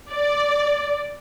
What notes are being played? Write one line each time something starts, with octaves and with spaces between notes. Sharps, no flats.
D5